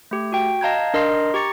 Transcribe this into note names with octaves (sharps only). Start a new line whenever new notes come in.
A3 G4
F#4 G5
D#5 F5 A5 A#5 G6 G#6
D4 A#4 D#5 A#5 C6 C7
G4 A#5 C#6 A6 C#7